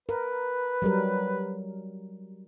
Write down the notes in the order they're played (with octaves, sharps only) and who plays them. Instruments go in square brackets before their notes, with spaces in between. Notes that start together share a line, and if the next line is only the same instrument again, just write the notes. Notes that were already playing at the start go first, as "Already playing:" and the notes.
[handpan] A#4 [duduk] B4
[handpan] F#3 G3 A#4